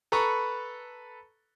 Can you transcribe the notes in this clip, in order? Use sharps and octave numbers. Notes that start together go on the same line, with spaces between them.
A4 B4 A#5 B5 C#6